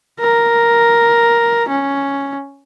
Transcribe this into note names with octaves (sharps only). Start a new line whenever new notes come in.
A#4
C#4